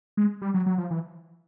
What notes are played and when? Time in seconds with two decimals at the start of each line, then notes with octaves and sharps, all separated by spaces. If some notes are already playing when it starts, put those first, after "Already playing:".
0.17 G#3
0.42 G3
0.54 F#3
0.66 F#3
0.78 F3
0.91 E3